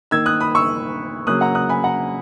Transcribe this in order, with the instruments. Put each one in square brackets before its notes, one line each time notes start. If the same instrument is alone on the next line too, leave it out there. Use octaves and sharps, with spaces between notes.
[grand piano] D#3 A#3 E6 G#6
D#6 F#6
B5 D#6
C#6 E6
C#3 F#3 A#3 D#6 F#6
F#5 A#5
D#6 F#6
G#5 B5
F#5 A#5